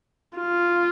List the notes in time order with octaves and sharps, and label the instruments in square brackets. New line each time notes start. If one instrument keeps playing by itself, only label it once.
[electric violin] F4